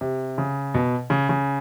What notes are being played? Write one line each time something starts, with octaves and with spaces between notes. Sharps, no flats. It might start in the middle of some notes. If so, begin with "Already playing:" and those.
C3
C#3
B2
C#3
C#3